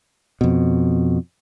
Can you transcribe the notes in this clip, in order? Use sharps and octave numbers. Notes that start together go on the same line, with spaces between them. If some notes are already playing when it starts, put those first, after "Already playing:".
F2 B2